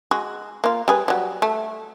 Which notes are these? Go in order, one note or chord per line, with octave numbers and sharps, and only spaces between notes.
G#3 F#4
A#3 F4
G3 G#4 B4
F#3 G3
A3